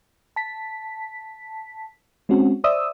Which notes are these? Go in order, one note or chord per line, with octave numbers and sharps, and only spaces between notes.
A5 B6
G#3 C4 C#4 F#4
C5 D5 E5 D#6 E6